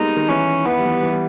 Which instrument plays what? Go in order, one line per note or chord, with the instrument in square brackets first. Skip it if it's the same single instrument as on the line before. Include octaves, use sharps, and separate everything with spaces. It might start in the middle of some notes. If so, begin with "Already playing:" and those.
Already playing: [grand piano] G3 G#3 A#3 B3 [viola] D#4
[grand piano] D#3
[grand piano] E3 [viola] C#4
[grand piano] E3 [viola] B3
[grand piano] G3
E3
G3
E3
G3